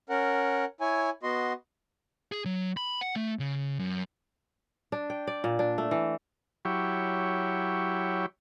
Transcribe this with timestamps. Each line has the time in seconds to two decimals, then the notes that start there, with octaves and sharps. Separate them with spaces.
0.10 C#4 A#4 F#5
0.81 E4 C#5 G#5
1.23 B3 F#4 D#5 C6
2.32 G#4
2.45 F#3
2.77 B5
3.01 F#5
3.16 A3
3.39 C#3
3.79 F#2
4.92 D4
5.10 G5
5.27 D5
5.44 A#2
5.59 D4
5.78 A3
5.91 E3
6.65 F#3 E4 G4 C#5